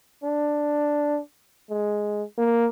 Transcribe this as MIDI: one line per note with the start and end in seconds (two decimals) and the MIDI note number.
0.24 1.19 62
1.70 2.23 56
2.38 2.67 58